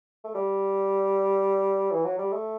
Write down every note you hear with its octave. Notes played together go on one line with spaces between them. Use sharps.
A3
G3
E3
F#3
G3
A3